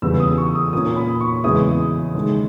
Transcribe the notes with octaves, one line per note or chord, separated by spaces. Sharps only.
E2 C#3 G3 B3 E6
D#6
C#6
D#6
A#2 A#3 C#4 D#6
B5
C#6
E2 C#3 G#3 B3 E4 D#6
D#2 C#3 G#3